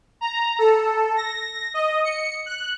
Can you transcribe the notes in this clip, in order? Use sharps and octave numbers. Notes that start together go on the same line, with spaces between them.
A#5
A4
A#6
D#5
C#7
F#6